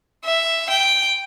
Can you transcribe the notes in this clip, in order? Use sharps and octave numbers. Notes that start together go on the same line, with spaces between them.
E5
G5